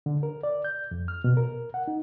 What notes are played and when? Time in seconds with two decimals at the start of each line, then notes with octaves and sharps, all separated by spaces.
0.06 D3
0.23 A#4
0.43 D5
0.65 G6
0.91 F2
1.08 F6
1.24 B2
1.37 A#4
1.74 F#5
1.88 D#4